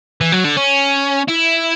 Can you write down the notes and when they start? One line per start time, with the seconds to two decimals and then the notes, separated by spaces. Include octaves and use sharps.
0.21 E3
0.32 F#3
0.44 D3
0.57 C#4
1.29 E4